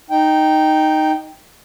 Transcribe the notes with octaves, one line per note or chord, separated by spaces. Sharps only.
D#4 G5